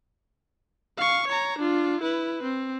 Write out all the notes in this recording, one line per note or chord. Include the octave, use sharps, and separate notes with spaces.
F5 C#6
C#5 A#5
D4 F4
E4 B4
C4